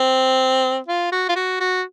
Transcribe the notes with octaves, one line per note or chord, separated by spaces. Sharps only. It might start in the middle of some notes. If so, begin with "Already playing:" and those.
Already playing: C4
F4
F#4
F4
F#4
F#4